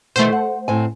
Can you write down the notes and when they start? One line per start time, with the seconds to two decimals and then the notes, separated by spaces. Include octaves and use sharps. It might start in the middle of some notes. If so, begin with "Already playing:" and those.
0.16 B2 D#3 E3 A3 C5
0.33 F#5
0.68 A2 C4 G#5